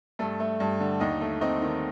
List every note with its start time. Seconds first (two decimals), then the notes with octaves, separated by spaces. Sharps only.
0.19 G2 A3 A4
0.40 A3
0.60 G2
0.80 D3
1.00 D#2 D#4 D#5
1.21 A3
1.41 C4 D#4 D#5
1.62 D#3